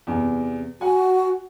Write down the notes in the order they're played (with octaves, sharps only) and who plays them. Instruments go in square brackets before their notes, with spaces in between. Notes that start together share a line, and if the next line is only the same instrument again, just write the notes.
[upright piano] E2 C3
[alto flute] F#4 [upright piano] F#5 G#5